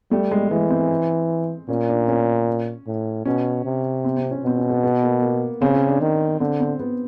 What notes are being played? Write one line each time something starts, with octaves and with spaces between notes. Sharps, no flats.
G3 A3
G#3
E3 G#3
C4
A#2 C#4
D4
C#4
A2
B2 C#4
C3
C4
C4
C#4
B2 C4
C#4
B3
B3
A#3
A#3
C#3 C4
C#4
D4
D#3
D3 C4
C4
B3